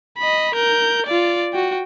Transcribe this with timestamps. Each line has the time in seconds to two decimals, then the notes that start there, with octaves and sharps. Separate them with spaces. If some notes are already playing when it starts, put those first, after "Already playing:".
0.18 D#5 B5
0.55 A#4 G6
1.06 F4 D5
1.53 F#4 G5